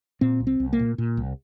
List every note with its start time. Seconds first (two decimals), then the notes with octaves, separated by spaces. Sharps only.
0.21 A#2 C4
0.40 C2
0.47 C4
0.60 C2
0.73 A#3
0.79 A#2
0.98 A#2
1.17 C2